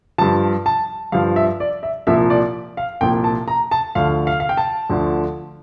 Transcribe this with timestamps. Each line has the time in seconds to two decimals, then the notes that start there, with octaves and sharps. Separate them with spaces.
0.18 G2 F3 A5
0.66 A5
1.12 G2 F3 F5
1.36 E5
1.60 D5
1.83 E5
2.07 C2 A#2 F3 E5
2.30 D5
2.77 F5
3.01 C2 A#2 F3 G5
3.24 A5
3.48 A#5
3.71 A5
3.95 D2 D3 F3 F5
4.27 F5
4.40 F5
4.49 G5
4.57 A5
4.90 D2 D3 F3